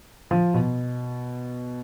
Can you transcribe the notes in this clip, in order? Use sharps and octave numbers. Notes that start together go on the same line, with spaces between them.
F3
B2